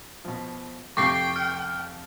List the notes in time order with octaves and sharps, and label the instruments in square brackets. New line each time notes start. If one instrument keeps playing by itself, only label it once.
[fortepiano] B2 F3
[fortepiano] F2 C3 A3 [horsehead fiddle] G5 [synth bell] C#6 D6 C7
[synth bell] F6